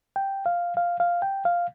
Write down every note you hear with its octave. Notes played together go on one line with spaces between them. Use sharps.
G5
F5
F5
F5
G5
F5